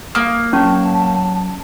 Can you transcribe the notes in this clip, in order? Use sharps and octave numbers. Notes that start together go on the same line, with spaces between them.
A#3 D#6
F#3 C#4 A5 C#6